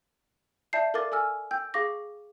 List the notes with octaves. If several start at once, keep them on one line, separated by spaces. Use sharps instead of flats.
D5 E5 A5 G6 C7
A4 A#4 D5 F5 D6 A6
A4 G#5 E6 F6
G5 E6 G6
G#4 F5 C#6 D6 A#6